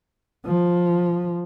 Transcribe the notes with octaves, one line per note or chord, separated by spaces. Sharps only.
F3